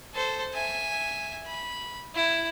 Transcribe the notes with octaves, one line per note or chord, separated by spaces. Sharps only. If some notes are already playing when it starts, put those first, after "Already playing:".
A4 C5
E5 G#5
B5
E4